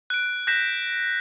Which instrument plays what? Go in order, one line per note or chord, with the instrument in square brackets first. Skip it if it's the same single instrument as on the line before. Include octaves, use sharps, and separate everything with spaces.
[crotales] F#6 D7
F#6 G6 A#6 B6 E7